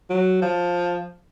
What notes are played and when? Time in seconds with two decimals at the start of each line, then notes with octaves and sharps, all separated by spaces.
0.10 F#3
0.42 F3